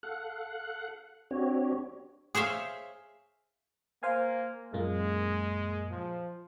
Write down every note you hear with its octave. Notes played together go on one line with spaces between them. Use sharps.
A4 F5 F#5 F#6
C4 D4 F#4 G4 C#5
G#4 C5 C#5 E5 F5
A#3 C5 F5 G#5
F#2 A#2 G#3 A#3
F3